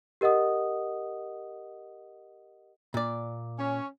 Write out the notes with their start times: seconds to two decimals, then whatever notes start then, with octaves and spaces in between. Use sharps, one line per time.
0.21 G4 A#4 D#5 F#5 D#6
2.94 A#2 D5
3.59 C#4